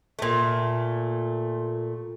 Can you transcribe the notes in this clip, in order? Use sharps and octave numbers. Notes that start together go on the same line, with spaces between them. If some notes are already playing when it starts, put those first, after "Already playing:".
A#2 A3